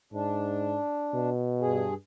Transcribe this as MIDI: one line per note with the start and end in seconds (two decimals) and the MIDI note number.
0.13 0.80 44
0.13 1.30 62
1.14 1.89 47
1.61 1.94 43
1.61 1.94 68